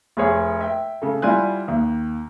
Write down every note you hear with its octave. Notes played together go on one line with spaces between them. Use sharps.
F1 G#4 C#5
E5 G5
C#3 A3
G3 E4 F4 G#5 F#6
D#2